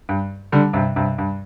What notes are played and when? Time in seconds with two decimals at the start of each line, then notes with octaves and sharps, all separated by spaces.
0.09 G2
0.52 D3 G3
0.73 G2 C3
0.96 G2 C3
1.18 G2